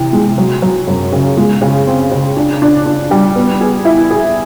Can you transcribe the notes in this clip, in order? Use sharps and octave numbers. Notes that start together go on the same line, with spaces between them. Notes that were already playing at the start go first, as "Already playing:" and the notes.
Already playing: C3 E3
G#3
F#3
F#3
F#2
C#3
G#3
C#3
C4
C#3
D4
D4
D4
G3
B3
G#4
E4
G#4